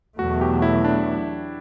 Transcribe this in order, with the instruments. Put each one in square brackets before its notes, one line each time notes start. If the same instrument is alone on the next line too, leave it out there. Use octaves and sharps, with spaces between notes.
[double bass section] E2 B2 F#3 A3 [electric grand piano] F#4
[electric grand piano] G4
E4
D4